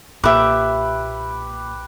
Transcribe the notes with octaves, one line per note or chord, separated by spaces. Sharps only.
B1 A#2 G4 B4 E5 D6